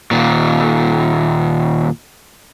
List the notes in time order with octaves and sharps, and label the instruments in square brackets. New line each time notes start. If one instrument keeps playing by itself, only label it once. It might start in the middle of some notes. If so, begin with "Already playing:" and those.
[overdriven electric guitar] D#2 A#2